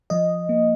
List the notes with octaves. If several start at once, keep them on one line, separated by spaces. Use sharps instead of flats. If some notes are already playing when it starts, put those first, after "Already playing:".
F3 D#5
A#3